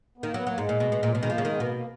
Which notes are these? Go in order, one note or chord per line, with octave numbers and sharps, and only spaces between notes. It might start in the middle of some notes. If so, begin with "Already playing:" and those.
B3
D#3 A#3
F#3 B3
F#3 A#3
G#2 G#3
A#2
B2
B2
A#2
F#3
B2 G#3
D#3
F3 A#3
C#3 F#3
D#3 G#3
B3
B2 A#3
A#3